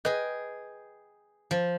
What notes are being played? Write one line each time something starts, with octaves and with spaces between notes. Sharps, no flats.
G#4 B4 D#5 G5
F3